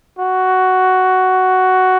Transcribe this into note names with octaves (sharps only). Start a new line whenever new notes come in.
F#4